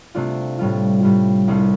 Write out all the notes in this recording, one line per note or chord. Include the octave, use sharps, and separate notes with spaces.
C3 A3 D4 F4
A2 G3 F4
A2 G3 F4
C2 C3 A3 F4